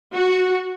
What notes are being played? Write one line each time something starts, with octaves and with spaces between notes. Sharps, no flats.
F#4